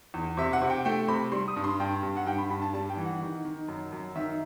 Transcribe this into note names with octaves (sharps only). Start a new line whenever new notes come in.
E2
C3 E5
F#5
C3
G5
A3 G5
C3 B5
G3 C6
D#6
G2
C6
G2 G5
G2
F#5
G2 G5
B5
G2 B5
A5
G3 A5
G5
E3
F#5
D#3
D#3
F#2
F#2
D#3 E5